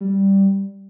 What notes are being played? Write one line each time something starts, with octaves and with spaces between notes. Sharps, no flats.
G3